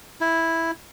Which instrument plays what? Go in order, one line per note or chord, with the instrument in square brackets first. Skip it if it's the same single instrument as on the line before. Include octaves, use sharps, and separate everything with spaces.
[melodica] E4